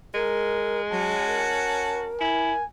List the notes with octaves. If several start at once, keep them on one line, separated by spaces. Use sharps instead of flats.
G#3 A#4
F#3 C#4 F#4 A5
A#4
E4 G#5